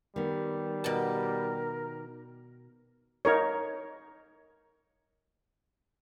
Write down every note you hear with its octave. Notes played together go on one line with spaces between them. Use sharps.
D#3 G3 B3
B2 A#4 A5
D#4 A#4 C#5